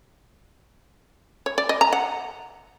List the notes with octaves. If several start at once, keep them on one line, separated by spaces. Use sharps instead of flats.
C#5
D5
D#5
A#5
F#5